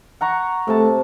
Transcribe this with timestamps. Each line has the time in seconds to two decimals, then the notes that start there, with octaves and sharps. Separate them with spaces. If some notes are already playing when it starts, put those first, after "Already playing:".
0.21 F#5 A#5 C#6
0.68 C3 A3 A5